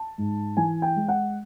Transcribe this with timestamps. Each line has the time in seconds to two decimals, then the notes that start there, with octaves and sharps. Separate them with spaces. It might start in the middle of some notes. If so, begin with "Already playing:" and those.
Already playing: A5
0.18 G#2
0.57 E3 G#5
0.82 G5
0.96 G#3
1.08 F#5